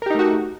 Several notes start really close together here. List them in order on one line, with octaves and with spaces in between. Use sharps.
A#4 G4 D#4 A3 F#4